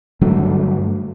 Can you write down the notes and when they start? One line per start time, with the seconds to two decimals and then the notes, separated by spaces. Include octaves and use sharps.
0.21 G2 D3 F#3 A3